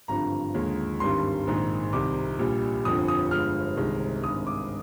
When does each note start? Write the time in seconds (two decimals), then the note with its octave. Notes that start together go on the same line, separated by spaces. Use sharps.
0.08 G#1 G2 D3 F3 A#5
0.54 D#2 D3 F3 G#3
1.00 G#1 G2 D#3 G3 C6
1.47 A#1 G#2 D#3
1.93 C2 C3 D#3 D6
2.39 A#1 A#2 G3
2.85 G1 F2 D3 F3 D#6
3.08 D#6
3.31 G1 G2 D3 F3 G#3 F6
3.77 C2 C3 D#3 G#3
4.23 G#1 G2 D#3 G#3 D#6
4.47 D6